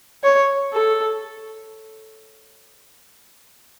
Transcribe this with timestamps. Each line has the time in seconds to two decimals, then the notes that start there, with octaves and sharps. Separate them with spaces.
0.24 C#5
0.74 A4